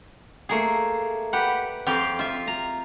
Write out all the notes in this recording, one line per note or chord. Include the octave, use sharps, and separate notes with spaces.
A3 A#3 G#4
G4 B4 F#5
F2 G4 F5 C6
F4 E5
A#5